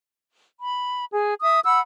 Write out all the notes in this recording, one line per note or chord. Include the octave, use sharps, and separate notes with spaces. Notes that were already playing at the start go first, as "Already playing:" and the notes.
B5
G#4
E5 D#6
F#5 B5 E6